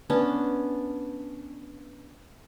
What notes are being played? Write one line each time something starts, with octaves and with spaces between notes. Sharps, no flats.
B3 C#4 D4